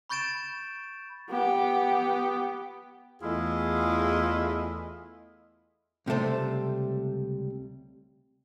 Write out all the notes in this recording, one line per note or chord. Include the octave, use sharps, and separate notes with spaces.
B5 C#6 G6 A6 D7 E7
B3 G4
E2 A3 E4 F4 G#4 D#5
C#2 C3 G3 A3 C5